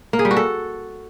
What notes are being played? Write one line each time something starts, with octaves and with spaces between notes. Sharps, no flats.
A#3
G#4
G3
F#4
A4